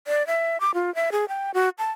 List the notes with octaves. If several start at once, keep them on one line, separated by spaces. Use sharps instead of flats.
D5
E5
D6
F4
E5
G#4
G5
F#4
A5